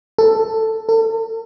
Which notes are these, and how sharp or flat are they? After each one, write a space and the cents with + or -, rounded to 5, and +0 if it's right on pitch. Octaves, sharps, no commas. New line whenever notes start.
A4 +10
A4 +40